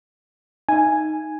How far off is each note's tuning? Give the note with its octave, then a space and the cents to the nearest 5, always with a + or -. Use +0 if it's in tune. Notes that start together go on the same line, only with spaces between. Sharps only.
D#4 +0 E5 +45 G#5 +0